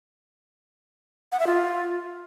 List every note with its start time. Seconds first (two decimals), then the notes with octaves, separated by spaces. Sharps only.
1.32 F#5
1.39 E5
1.47 F4